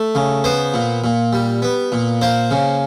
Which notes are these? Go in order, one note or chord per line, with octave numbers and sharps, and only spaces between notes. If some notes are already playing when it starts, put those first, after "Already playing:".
Already playing: A3
C#3
B3 C5
A#2
A#2
G3
B3
A#2
A#3 C5
C#3